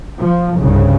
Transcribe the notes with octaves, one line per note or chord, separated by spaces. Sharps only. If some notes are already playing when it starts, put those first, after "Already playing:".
F3
C2 G2 C#3